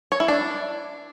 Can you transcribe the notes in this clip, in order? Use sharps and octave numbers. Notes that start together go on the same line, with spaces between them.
C#5
E4
D4